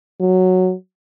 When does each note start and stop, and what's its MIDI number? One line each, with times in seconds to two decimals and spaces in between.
0.20 0.73 54